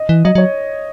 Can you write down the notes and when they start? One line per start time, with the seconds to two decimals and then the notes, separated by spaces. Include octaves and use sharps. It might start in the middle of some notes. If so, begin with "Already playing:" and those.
Already playing: D#5
0.09 E3
0.25 F#3 D#5
0.35 F#3 C#5